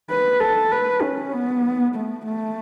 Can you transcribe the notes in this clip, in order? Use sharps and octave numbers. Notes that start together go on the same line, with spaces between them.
B4
A4
B4
C#4
B3
A3
A3